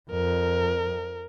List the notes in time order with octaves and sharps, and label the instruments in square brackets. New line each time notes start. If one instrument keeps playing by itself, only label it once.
[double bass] F2 [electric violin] A#4